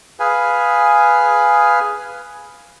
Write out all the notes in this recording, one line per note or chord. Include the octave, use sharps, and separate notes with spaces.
G#4 B4 F5 G#5